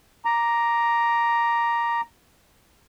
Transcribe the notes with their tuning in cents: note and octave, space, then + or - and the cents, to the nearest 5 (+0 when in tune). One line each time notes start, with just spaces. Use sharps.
A#5 +5 D6 +0